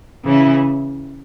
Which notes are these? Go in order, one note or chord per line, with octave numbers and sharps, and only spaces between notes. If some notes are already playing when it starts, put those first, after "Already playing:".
C#3 E3 C#4 E4